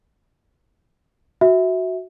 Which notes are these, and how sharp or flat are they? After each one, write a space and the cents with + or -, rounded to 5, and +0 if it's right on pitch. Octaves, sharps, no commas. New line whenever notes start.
F#4 +0 E5 -15